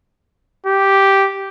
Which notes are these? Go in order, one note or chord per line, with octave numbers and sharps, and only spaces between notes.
G4